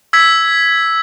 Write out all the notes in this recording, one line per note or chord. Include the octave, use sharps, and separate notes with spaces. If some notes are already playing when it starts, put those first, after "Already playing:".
E6 G#6 B6